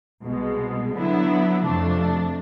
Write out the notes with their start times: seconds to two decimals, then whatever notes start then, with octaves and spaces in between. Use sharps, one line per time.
0.25 C2 B2 G#3
0.94 D3 F#3 B3 E4
1.63 F2 C3 F3 A3 D4